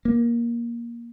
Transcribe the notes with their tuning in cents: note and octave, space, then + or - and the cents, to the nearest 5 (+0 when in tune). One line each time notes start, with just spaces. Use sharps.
A#3 +15